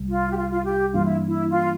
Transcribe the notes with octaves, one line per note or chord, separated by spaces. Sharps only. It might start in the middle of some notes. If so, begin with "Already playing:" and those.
Already playing: C2 C3 G3
F4
G4
F4
F4
G4
G2 E3 G3 A#3 D4 F4
E4
E4
F4